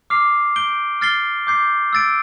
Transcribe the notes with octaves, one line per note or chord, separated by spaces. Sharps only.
D6 F6 C7 F7
G6 D7 G7
F6 A6 C7 G7
D6 G6 C7
E6 A6 D7